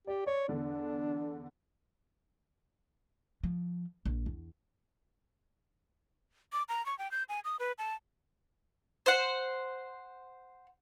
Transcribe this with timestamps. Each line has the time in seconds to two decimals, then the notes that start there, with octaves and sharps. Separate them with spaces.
0.07 G4 D5
0.27 C#5 D5
0.49 E2 D3 D4
3.43 F3
4.05 A#1
4.26 E2
6.53 D6
6.69 A#5
6.86 C#6
6.99 G5
7.11 G6
7.29 G#5
7.45 D#6
7.59 B4
7.78 A5
9.06 C5 F#5